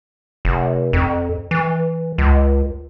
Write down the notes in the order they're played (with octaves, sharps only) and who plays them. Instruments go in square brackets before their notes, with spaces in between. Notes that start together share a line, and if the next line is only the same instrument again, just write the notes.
[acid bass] F1
F2
E3
C#2